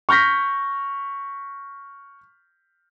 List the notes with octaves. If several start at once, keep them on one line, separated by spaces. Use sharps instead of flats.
C#6 F6 G6 A#6 B6